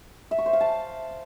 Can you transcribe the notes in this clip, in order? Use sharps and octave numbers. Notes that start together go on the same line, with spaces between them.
E5
C#6
C5
F5
A5